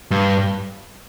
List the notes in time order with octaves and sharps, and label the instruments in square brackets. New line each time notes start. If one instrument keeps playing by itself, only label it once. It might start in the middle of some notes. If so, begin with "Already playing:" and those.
[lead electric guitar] G2